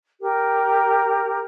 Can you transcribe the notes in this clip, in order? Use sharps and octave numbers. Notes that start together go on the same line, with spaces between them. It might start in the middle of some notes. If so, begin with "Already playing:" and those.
G4 A#4